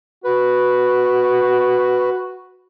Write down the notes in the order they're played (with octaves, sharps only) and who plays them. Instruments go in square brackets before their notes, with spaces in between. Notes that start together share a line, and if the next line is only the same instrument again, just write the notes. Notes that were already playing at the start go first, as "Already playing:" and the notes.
[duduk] F#4 [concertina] B4